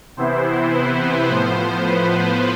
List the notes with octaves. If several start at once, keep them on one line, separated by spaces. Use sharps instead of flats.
C3 E3 B3 E4 C5
B4
A2 F3 B3 C5
B4